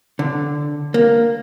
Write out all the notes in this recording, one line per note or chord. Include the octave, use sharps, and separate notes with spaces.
D3
A#3